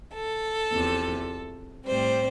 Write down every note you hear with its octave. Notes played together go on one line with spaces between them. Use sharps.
A4
E2 C3 F3
A2 G3 C4 C5